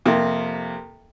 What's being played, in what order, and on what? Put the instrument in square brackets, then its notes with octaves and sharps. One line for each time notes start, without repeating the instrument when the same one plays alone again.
[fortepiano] F2 C3 A#3